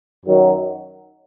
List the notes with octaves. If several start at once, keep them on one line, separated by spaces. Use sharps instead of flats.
F#2 D#3 F#3